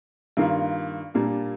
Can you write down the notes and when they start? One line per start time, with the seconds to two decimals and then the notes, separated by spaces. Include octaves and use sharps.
0.37 G2 D#3 A#3 F4
1.14 A#2 G3 A#3 D4